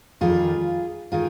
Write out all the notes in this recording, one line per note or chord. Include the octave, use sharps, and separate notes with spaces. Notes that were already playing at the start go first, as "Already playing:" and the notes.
F2 D#3 G3 F4 G#4
D#3 F4 G#4